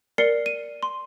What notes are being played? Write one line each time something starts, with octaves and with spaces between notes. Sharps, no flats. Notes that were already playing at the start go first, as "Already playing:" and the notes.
A#4 D5 C7 C#7 G7
D#7
C6